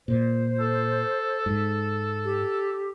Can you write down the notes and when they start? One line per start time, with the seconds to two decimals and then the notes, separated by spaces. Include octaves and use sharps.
0.08 A#2 C5
0.59 A4
1.46 G#2
2.24 G4